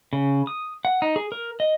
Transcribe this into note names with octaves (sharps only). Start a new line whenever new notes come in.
C#3
D#6
F#5
D#4
G#4
A#4
D#5